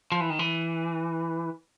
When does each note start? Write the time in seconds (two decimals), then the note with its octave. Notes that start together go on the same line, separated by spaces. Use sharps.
0.12 F3
0.21 E3
0.30 D#3
0.39 E3